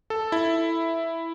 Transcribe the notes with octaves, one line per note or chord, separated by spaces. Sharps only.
A4
E4